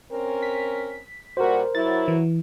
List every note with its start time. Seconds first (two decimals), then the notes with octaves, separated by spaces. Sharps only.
0.11 C4 C#4 A#4
0.43 B6
1.37 A#2 G3 F#4 A#4 C5
1.75 F#3 E4 A6
2.08 E3